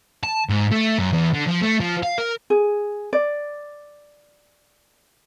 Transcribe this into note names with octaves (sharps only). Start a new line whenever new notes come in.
A5
G#2
A3
F#2
E2
D3
F3
A3
F3
F5
A#4
G#4
D5